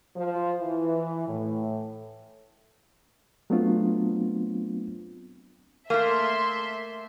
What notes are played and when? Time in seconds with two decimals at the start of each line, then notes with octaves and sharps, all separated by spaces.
0.16 F3
0.59 E3
1.28 A2
3.50 F#3 A3 B3 C4 D4 F4
5.90 A3 A#3 E5 C6